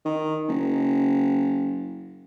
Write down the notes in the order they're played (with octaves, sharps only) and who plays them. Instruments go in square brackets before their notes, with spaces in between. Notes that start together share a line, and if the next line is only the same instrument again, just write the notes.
[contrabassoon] D#3
F#1